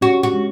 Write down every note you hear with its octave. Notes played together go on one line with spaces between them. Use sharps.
C#4 F#4
F#4
G#3